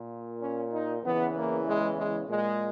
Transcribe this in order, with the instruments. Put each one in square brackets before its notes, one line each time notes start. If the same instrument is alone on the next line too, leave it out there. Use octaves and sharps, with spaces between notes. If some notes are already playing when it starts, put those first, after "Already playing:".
Already playing: [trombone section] A#2
C#4
D#4
E2 C#3 E3 B3
A#3
G#3
G#3
A#2 G#3